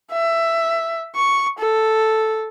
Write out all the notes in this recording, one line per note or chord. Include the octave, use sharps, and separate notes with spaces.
E5
C#6
A4